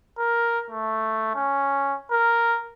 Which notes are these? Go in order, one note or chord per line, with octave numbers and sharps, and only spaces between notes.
A#4
A3
C#4
A#4